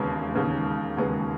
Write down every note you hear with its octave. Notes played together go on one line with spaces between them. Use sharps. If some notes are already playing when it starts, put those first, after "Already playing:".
Already playing: E1 D#2 C#3 G#3 B3
E1 D#2 C#3 G#3 B3
E1 D#2 C#3 G#3 B3